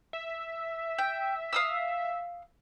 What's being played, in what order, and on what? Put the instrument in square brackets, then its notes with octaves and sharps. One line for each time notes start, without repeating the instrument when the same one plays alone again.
[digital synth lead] E5
[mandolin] G5
F5 D#6 E6